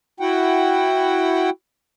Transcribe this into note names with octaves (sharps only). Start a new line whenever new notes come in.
E4 F#4 F#5 G5